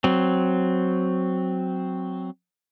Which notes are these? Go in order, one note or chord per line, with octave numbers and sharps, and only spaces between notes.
F#3 C4